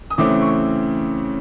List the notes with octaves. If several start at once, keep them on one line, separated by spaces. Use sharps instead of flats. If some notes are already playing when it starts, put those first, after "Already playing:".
D#6
C#3 E3 A3 C4 D6
C#6